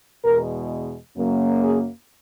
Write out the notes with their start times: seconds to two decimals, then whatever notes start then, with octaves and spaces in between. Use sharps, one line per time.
0.25 E2 B2 G#3 A#4
1.16 F#2 C#3 F#3 A#3
1.61 G#4